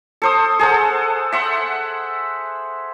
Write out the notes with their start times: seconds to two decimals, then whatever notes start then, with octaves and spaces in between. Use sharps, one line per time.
0.22 A4 C5 D#6
0.59 G#4 A4 C5 F#5
1.32 E5 F#5 C6